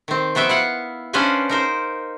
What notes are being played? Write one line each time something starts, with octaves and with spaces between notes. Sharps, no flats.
D#3 C4
F3 B3 F#4 E5 G5
E4 F5 F#5
C#4 D4 B4 C5 F5 G#5
D#4 A#4 C5